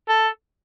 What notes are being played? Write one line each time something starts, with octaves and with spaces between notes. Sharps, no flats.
A4